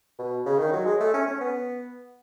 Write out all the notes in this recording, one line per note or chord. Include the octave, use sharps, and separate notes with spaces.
B2
C#3
D#3
F#3
G#3
A3
C#4
C#4
B3